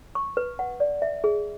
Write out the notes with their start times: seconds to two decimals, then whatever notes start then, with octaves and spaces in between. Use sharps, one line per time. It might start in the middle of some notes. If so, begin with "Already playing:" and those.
0.15 C#6
0.37 B4
0.59 F#5
0.80 D5
1.02 E5
1.24 G#4